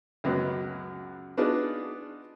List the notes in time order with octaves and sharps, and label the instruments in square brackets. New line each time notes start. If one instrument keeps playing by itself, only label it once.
[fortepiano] C#2 F#2 F#3 G#3 B3
B3 D4 D#4 F4 F#4 G#4